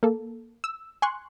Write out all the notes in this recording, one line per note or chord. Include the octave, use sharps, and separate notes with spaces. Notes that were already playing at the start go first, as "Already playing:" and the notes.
A#3 A4
E6
G#5 C6 C#6 F#6